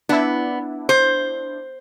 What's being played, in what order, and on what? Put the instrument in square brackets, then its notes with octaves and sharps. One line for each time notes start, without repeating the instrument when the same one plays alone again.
[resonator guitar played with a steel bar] B3 [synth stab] D4 E4
[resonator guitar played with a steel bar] C5